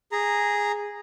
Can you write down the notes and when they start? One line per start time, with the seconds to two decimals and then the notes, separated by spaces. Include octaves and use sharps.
0.12 G#4 A#5